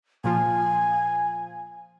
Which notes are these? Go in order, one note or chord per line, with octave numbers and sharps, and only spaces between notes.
A#2 F3 F4 G#5